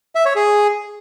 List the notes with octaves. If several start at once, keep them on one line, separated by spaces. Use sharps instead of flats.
E5
C#5
G#4